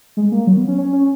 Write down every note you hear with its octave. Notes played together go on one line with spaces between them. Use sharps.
G#3
A#3
F#3
B3
C#4
C#4
C#4